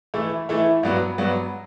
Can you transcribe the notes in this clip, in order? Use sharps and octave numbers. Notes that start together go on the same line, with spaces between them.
E3 A3 E4
E3 A3 E4
G2 F#3 B3 F#4
G2 F#3 B3 F#4